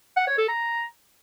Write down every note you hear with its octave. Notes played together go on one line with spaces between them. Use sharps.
F#5
C#5
A4
A#5